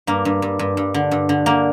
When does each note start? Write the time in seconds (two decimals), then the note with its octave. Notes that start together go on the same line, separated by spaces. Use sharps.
0.07 G2 A#3
0.25 G2
0.42 G2
0.59 G2
0.77 G2
0.94 D3
1.11 G2
1.29 D3
1.46 D3 A#3